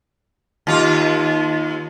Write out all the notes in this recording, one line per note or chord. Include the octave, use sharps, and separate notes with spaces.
D#2 F4